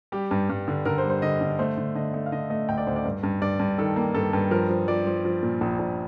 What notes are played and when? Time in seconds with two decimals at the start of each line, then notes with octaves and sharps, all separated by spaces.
0.12 G3 G4
0.31 G2
0.49 G2
0.68 D3
0.85 D3 A#4
0.98 C5
1.04 G3
1.10 C5
1.22 D3 D#5
1.41 D3
1.59 A3 C5
1.77 D3
1.95 D3 D#5
2.14 A3
2.26 F5
2.32 D3 D#5
2.50 A3 D#5
2.69 D2 G5
2.78 D5
2.87 D2 C5
2.96 D5
3.05 G2
3.23 G2
3.42 G2 D5
3.59 G2
3.78 D#3 A4
3.96 A#3
4.15 G2 A4
4.33 G2
4.51 F3 A#4
4.69 F3
4.88 F3 D5
5.06 F3
5.25 F3
5.43 A#2
5.61 A#1
5.79 A#1